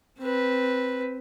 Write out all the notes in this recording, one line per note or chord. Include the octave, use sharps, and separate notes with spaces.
C4 B4